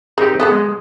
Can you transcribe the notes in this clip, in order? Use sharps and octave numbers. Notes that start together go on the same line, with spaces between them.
C4 D#4 G4 G#4 A#4 C5
B3 G#4 A4 D#5
G#3